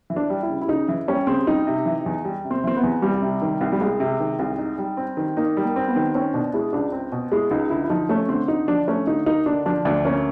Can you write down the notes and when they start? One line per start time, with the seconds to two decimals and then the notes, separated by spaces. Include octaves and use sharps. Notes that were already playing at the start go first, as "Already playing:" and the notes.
0.10 E3
0.16 D4
0.30 G3
0.43 E4
0.49 C#3
0.61 E4
0.68 C#3 D#4
0.88 E3
1.08 G3 C#4
1.27 C#3 C4
1.47 G3 D#4
1.67 C3
1.86 E3
2.06 E2
2.25 G3
2.45 C3
2.51 C4
2.64 E3 C4
2.77 B3
2.83 E2
3.02 C2 G3
3.22 C3
3.42 D#3
3.61 C2
3.72 G3
3.81 C2 G#3
4.00 C3
4.20 D#3
4.39 C2
4.58 D#4
4.78 G3
4.97 C4
5.17 D#3
5.37 A#3 D#4
5.57 G3
5.63 A#3
5.76 C4
5.88 B3
5.96 D#3
6.14 C4 C#4
6.34 B2 D4
6.54 G#3 E4
6.73 C#2 D4
6.92 C4
7.12 B2
7.32 G#3 E4
7.51 C#2 D#4
7.70 D3 E4
7.84 E4
7.90 F3 D#4
8.09 A3 C#4
8.29 D3 C4
8.48 D3 D#4
8.68 F3 D4
8.88 A3 C#4
9.07 D3 D#4
9.26 A#3 D#4
9.46 D3 D4
9.66 F3 D4
9.85 D2 D4
10.05 A#3 C#4